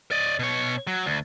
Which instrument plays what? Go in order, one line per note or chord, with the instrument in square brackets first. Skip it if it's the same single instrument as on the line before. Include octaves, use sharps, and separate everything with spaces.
[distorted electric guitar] D5 D#5
B2 C#5
F#3
D2